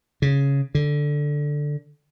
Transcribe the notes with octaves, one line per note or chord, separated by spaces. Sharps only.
C#3
D3